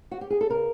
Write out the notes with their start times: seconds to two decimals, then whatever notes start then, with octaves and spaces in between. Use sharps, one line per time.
0.11 F#4
0.21 G4
0.30 G#4
0.41 A4
0.50 C#3 A#4